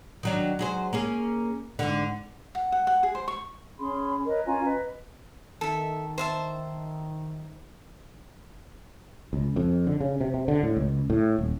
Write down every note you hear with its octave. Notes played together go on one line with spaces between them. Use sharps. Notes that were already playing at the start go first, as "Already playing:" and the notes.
D#3 F#3 D4
F#3 G#4 C5
A#3 C#4 G#4
G#2 D3
F#5
F#5
F#5
G#4
C5
C#6
C#4 G#4 B5 C6
A#4 B4 C#5 D#5
C#4 F4 G#5 A#5
B4 D#5
D#3 A4 E5
C5 E5 A5
C#2
F2
D3
C#3
C3
C3
D3
A2
C#2
A2
D#1